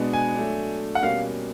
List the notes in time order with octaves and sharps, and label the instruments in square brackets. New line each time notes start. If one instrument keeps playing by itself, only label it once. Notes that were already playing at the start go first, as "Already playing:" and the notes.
Already playing: [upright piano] B2 G#3 B3 D4
[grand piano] G#5
[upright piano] F#3 A3 D4
[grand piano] F#5
[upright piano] B2 G3 A#3 C#4 [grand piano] F5